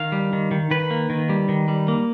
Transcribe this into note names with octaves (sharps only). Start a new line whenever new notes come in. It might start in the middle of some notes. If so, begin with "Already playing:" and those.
Already playing: D#3 F5
G3
D#3
D#3
D#3 B4
A#3
D#3
G3
D#3
G3
A#3